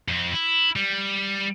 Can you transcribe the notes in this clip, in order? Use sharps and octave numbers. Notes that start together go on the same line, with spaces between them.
F2 C4
E4
G3